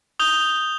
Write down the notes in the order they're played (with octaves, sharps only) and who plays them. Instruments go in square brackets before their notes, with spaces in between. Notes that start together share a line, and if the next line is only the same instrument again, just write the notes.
[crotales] D#6 G6 F7 G7